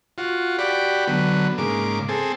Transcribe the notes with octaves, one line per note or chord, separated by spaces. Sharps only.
F4 F#4
F#4 G4 D5 B5
D3 F#3 B3
G#2 C#3 A#3 D6
C4 G#4 A4